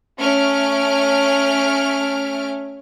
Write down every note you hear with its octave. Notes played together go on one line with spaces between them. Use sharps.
A3 C#4 F6 D7